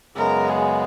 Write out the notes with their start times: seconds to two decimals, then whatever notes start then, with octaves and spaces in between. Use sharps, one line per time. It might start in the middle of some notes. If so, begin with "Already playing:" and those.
0.16 F#2 C#3 G#3 B3 A#4
0.49 G#4